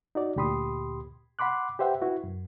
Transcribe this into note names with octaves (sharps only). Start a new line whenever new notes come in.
D#4 F#4 D5
D2 A#2 G4 B5 C6 D#6
F#5 B5 C6 D6 F#6
G4 B4 C5 E5 F#5 G5
E4 F#4 B4
F#2